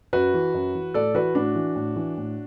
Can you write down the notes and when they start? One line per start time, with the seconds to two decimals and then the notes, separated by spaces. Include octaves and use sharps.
0.13 F#2 F#4 B4
0.34 E3
0.54 F#2
0.75 E3
0.94 A2 A4 D5
1.15 E3 F#4 B4
1.35 A2 D4 F#4
1.55 E3
1.76 A2
1.96 E3
2.17 A2